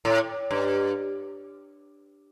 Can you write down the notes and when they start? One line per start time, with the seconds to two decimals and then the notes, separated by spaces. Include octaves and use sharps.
0.05 A2
0.51 G2